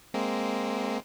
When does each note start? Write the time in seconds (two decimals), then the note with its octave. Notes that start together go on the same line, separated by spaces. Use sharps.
0.14 G#3 A#3 C4